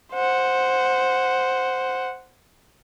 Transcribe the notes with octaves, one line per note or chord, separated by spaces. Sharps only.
C5 F#5